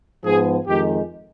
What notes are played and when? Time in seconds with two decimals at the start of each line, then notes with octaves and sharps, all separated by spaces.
0.24 G#2 F3 B3 G#4
0.67 F2 D#3 G#3 G4